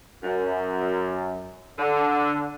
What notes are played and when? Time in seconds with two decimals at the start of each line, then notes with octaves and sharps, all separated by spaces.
0.23 F#2
1.78 D3